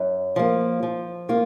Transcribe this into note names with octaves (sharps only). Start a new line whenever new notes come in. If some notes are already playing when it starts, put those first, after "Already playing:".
Already playing: F#2
F3 A#3
F3
A#3 F4